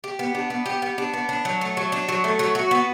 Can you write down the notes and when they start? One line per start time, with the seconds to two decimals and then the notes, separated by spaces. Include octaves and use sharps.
0.04 G4
0.19 B3
0.35 D4
0.50 B3
0.66 G4
0.82 B3
0.98 D4
1.14 B3
1.29 D4
1.45 F#3
1.61 A3
1.77 F#3
1.92 D4
2.09 F#3
2.24 A3
2.39 F#3
2.55 F#4
2.71 B3